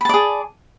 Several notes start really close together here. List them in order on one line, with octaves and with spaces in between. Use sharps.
B5 A5 D5 G#4